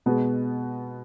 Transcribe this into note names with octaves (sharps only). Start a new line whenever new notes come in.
B2 G#3 B3